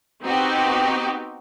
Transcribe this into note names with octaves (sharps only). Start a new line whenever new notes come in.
B3 C4 D#4 F#4 G4